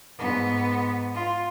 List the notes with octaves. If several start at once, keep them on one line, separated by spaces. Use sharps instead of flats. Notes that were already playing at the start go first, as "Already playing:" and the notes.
G#2 B3
F4